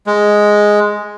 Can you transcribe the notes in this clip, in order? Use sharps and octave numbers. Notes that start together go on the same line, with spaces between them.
G#3